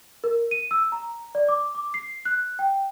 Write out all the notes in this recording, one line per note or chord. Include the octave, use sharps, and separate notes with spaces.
A#4
D#7
E6
A#5
D5
D6
D6
C7
F#6
G5